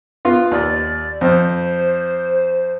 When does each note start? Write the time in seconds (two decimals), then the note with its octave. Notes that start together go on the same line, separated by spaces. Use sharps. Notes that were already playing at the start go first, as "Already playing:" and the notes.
0.25 B3 F4
0.51 D#2 D5
1.21 F2 C5